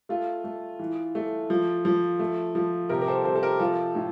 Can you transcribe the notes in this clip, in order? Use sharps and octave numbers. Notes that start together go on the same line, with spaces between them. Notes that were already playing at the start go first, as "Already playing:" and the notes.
A3 F4
A3
E3
A3
F3
F3
A3
F3
C3 G4 A#4
A#4
A4 C5
C3 A4 C5
A4
G4 A#4
F3 F4 A4
A2